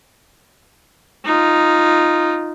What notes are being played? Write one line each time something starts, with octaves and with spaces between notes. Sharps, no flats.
D#4 F4